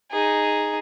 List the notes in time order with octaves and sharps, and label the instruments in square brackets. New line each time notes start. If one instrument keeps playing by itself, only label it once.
[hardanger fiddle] D#4 G#4